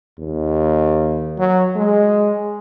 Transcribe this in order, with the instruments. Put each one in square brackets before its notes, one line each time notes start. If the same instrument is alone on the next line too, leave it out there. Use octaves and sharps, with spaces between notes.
[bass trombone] D#2
F#3
G#3